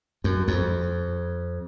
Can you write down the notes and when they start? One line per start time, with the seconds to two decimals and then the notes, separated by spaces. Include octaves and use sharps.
0.24 F#2
0.48 F2